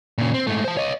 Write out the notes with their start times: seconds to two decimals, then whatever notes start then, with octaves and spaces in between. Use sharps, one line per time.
0.18 A#2 C#3
0.34 C4
0.47 G#2 A3
0.64 C5 A5
0.77 C#5 D#5